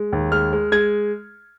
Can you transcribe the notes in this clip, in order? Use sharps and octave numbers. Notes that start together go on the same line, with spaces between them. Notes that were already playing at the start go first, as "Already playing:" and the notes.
Already playing: G#3
D#2
G#3 F6
G#3
G#3 G#6